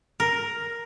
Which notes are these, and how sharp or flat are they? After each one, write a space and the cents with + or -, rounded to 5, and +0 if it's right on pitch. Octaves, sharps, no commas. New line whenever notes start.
A#4 +5